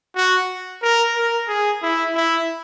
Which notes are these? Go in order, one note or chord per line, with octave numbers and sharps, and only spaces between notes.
F#4
A#4
A#4
G#4
E4
E4